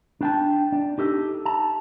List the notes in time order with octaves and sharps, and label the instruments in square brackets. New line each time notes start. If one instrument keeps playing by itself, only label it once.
[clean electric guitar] D4 G5 A5
D4
D#4 G4 A4
A5